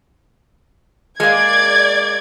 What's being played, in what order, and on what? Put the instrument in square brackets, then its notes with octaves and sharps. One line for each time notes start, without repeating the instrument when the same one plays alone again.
[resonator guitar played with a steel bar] G#3 A#3 [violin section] D5 G#6